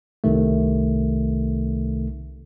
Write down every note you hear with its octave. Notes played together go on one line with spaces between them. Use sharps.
C2 C3 D#3 A3